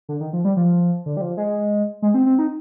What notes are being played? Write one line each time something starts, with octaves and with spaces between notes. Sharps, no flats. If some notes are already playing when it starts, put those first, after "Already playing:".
D3
D#3
F3
G3
F3
D3
G3
F3
G#3
G#3
C4
C4
D#4